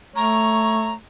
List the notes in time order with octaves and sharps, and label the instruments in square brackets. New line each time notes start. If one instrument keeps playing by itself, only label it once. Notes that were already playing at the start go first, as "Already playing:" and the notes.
[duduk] A3 [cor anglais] C#5 [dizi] A#5